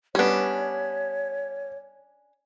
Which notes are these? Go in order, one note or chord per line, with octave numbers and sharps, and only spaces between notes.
G3 B3 C#4 D4 C#5